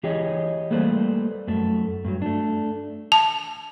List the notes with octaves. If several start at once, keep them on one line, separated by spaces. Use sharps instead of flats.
E3 G4 G#4 C#5 D#5
G3 A3 A#3 B4 C5 D5
F#2 A3
G2 F#3
A3 D4
A5